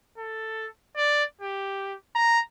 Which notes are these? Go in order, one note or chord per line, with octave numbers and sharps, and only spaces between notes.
A4
D5
G4
A#5